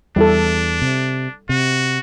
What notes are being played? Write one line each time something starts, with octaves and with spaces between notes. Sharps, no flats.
E2 G3 D4 E4 A4
C3
C3 F#4